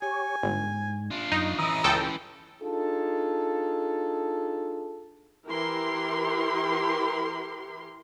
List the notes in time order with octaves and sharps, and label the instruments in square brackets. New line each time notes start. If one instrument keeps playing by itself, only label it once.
[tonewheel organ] G4 C#5 [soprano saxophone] G#5
[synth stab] G1 [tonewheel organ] G#2
[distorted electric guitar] D4 F4
[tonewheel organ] F#2 [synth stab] D#4
[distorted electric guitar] E3 C#4 [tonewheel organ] D#5 E5 D#6 [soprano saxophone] A#5
[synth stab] C#2 A4 G5
[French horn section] D4 D#4 F4 G#4 A4
[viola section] E3 E4 G4 A#4 C6